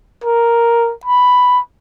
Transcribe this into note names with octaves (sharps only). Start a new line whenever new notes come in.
A#4
B5